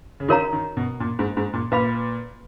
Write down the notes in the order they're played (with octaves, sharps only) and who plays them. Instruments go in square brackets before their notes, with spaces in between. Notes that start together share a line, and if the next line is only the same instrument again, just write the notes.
[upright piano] C#3
[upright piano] D#3 [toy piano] F#4 A#4 C#5 F5 A#5
[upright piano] D#3
B2
A#2
G#2
G#2
A#2
[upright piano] A#2 [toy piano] B4 F5 B5